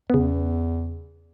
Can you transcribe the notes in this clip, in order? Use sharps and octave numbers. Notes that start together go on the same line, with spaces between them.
E2 C#3 B3